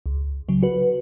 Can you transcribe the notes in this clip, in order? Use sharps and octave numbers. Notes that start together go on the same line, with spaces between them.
C#2
C#3 F#3
F#4 B4